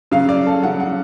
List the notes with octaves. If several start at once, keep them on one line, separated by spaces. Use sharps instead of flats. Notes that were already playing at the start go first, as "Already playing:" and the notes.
C#3 F#3 F5
D5
A4
C#3 F#3 F#5
F#5